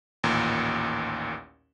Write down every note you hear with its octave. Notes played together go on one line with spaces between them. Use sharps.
A1 D#2 A#2